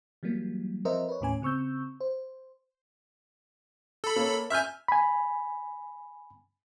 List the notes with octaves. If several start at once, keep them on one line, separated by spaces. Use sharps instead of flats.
E3 F#3 G3 A#3
F3 C4 A#4 C5 D#5 E5
B4 C#5
D#2 A2 C#4 G#5
C#3 C4 C#6 E6 G6
C5
A4 B5
A#3 C#5
E5 G#5 E6 F6 G6
G#5 B5